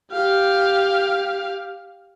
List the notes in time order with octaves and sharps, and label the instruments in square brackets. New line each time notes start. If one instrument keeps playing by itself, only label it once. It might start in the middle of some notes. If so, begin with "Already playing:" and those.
[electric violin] G4 F5